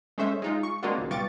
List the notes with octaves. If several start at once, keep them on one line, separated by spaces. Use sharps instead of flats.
G#3 A3 C#4 C5 E5
G#3 D#4 F4
C#6
G#3 A#3 C4 D4 F4 F#4
G#1 C#2
B2 G3 F4 C#6 D6 A6